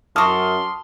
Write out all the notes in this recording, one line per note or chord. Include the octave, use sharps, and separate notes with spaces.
F#2 F#4 A4 C6 D6 D#6 F6